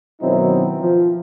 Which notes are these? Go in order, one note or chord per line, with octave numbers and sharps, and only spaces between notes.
B2 D#3 F#3 C4 D#4 E4
F3